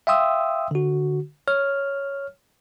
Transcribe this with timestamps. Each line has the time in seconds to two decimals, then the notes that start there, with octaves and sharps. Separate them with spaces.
0.07 E5 F5 G5 C6 D#6 E6
0.71 D3 F#4
1.48 C#5 F6